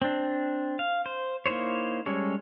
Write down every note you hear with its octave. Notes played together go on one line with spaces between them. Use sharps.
C4 D4
F5
C5
A#3 D#4 E4 C5 C#5
G3 G#3 C#4 A4 C#5